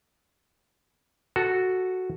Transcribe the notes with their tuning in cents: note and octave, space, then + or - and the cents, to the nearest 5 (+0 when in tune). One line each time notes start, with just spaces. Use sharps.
F#4 +0 A4 +0